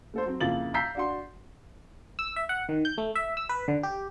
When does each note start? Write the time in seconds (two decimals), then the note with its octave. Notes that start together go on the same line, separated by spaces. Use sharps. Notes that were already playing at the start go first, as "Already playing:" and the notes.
0.14 A3 A4 C5
0.25 F#3 C4
0.41 F2 C#3 A#3 E4 A6 F#7
0.74 A#5 E6 G6 B6 C7
0.95 D4 F#4 C6
2.19 E6
2.36 E5
2.49 F#5
2.69 D#3
2.85 G6
2.98 A3
3.15 E5
3.37 E6
3.49 B4
3.68 D3
3.83 G4